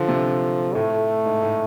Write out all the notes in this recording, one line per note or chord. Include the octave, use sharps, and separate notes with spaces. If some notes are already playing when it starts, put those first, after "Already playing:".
Already playing: D3 F3
C3
A2 A3
G#2
A2